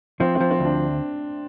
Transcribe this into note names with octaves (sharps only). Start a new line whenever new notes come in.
F3 C4
C4
F3
C4
D2 D4